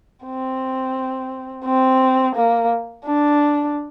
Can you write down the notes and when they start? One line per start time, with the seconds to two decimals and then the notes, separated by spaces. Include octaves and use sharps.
0.24 C4
1.65 C4
2.35 A#3
3.05 D4